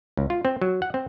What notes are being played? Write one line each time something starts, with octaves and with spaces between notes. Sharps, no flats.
C#2
F4
C4
F#3
F#5
C4